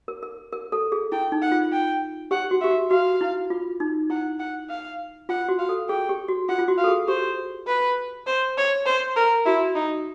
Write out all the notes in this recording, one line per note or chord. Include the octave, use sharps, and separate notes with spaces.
A#4
A#4
A#4
A4
G#4
E4 G5
D#4
F#5
F4
G5
G4 F#5
F#4
G4 E5
F#4
F#4 F5
E4
F4
D#4
E4 F#5
F#5
F5
F4 F#5
F#4
F5
A4
G#4 G5
G4
F#4
F4 F#5
F4
F#4
F5
A4
G#4
G4 C5
B4
C5
C#5
C5
A#4
E4 F#4
D#4